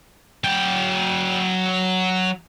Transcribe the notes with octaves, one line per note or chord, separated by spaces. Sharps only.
F#3 G5